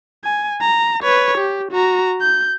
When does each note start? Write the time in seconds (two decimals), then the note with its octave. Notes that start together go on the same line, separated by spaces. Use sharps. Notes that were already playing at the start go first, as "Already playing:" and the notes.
0.24 G#5
0.61 A#5
1.03 B4 C#5
1.38 G4
1.71 F#4 A#5
2.21 G6